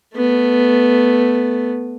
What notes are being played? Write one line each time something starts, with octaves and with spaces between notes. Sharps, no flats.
A3 B3